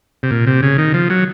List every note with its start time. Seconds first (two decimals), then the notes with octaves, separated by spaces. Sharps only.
0.23 C3
0.31 A#2
0.47 C3
0.63 C#3
0.78 D#3
0.94 F3
1.10 F#3